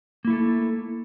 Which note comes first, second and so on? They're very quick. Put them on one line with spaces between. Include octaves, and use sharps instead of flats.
A#3 E4 A3 A4